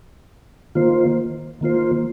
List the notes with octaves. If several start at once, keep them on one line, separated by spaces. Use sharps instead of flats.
D#3 A#3 F4 C5
D#3 A#3 F4 C5